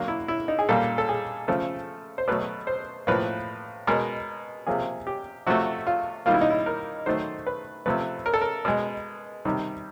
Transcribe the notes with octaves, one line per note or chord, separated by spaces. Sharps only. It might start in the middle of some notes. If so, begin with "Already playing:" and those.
Already playing: D3 F#3 A#3
E4
E4
D#4
G#4
A#2 G3 A#3 A4
A4
G#4
C#3 F3 A3 A4
C5
B2 F#3 A3 B4
C5
A2 F3 A#3 B4
B2 G#3 A#4
C3 F3 A#3 G#4
G4
C3 F3 A3 F#4
F4
D#3 G3 A#3 F4
E4
D#4
E4
A#4
D#3 F#3 A3 C5
B4
C3 F3 A3 B4
A#4
A4
A#4
B2 G#3
C3 D#3 G3